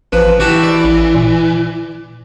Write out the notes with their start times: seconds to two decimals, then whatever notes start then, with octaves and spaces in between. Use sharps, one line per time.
0.12 A1 F3 B4
0.40 E3 F#4 G4 A5
0.64 D5
0.84 A1
1.15 A#2